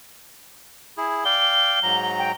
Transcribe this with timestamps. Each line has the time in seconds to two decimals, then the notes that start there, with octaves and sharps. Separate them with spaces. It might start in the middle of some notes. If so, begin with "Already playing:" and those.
0.98 E4 G#4
1.25 D5 F5 G5 G7
1.83 G#2 F#3 A#5
2.18 G5